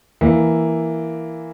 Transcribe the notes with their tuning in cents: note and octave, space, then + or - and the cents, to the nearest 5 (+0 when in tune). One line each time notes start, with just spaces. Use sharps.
E3 +0 A#3 +0